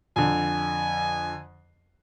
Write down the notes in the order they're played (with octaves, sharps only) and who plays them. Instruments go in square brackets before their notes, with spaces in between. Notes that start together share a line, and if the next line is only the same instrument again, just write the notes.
[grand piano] F2 D3 [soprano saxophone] G#5